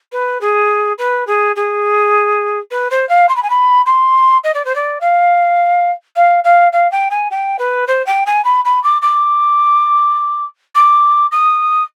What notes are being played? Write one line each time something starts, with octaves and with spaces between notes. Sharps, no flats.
B4
G#4
B4
G#4
G#4
B4
C5
F5
C6
B5
G#5
B5
C6
D#5
D5
C5
D5
F5
F5
F5
F5
G5
G#5
G5
B4
C5
G5
G#5
B5
B5
D6
D6
D6
D#6